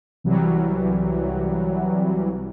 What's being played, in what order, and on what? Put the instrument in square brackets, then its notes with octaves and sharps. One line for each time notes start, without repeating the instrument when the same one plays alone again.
[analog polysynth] C2 E3 F#3 G3